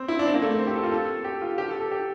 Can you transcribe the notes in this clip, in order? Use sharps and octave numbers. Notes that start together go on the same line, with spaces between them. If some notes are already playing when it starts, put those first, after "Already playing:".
Already playing: C4
E4
D4
C4
A#3
A3
C4
G4
A4
F4
A4
G4
F4
G4
A4
A4
G4